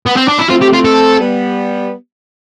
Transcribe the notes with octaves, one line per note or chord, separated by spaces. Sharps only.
B3
C4
D4
E4
A3 C4 F4
G4
F4
A4
G3 B3